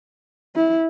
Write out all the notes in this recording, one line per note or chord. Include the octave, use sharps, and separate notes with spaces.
E4